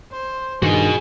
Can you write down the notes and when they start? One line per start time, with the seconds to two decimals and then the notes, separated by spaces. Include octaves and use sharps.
0.12 C5
0.62 G2 D#3 F#4 G#4 D#5